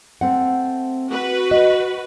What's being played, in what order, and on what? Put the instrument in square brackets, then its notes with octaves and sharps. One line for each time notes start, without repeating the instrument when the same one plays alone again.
[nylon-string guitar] A3 C4 F#5
[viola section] F#4 B4
[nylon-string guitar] D#5